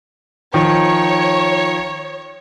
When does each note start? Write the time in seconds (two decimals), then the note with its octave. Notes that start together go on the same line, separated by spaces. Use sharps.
0.54 D#3 F3 C#5